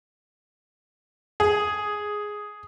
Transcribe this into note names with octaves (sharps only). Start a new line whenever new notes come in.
G#4